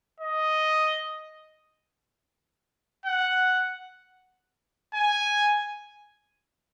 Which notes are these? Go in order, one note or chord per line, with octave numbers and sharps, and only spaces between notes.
D#5
F#5
G#5